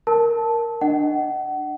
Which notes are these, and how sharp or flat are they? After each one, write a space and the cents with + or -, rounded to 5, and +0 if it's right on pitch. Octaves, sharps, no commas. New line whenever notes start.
A#4 +0 A5 -5
D4 +20 D#5 +0 F#5 +30